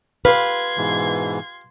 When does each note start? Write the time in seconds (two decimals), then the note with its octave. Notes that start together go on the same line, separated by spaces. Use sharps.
0.25 F4 G4 B4 F5 C6 G#6
0.77 G#2 B2 E3